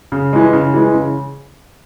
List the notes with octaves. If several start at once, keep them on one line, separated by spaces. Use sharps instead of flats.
C#3
E3 G#3
C#3
E3 G#3
C#3